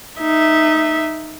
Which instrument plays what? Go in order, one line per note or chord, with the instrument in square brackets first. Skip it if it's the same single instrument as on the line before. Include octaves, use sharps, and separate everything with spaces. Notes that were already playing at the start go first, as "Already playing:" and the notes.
[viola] D#4 E5